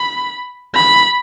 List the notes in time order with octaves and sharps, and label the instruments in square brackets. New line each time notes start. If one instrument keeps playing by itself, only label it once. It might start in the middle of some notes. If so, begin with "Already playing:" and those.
Already playing: [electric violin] B5
B5